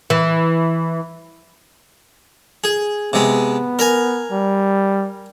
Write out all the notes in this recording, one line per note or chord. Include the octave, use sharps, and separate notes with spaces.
E3
G#4
C3 G#3 B3
A#4 G#5
G3